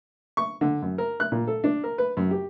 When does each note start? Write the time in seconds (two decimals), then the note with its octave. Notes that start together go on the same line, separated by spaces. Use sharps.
0.37 C#6
0.61 D3
0.82 F#2
0.98 A#4
1.20 F#6
1.32 A#2
1.47 A4
1.64 D4
1.84 A#4
1.98 B4
2.17 F#2
2.31 G4